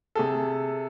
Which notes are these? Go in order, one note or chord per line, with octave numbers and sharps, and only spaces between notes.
C3 G#4 A4